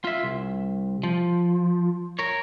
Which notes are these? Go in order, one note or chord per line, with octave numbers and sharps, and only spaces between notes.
F4 E5
C2
F3
A#4 C#5